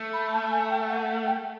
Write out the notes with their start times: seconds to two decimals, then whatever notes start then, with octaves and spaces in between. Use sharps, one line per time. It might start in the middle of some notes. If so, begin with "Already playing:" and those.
Already playing: A3
0.12 B5
0.32 A5
0.51 G#5
0.69 G5
0.88 F#5
1.07 F#5
1.26 G5